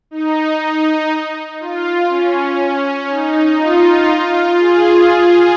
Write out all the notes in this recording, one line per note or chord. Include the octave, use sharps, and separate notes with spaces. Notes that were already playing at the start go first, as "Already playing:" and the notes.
D#4
F4
C#4
D#4
F4
G#4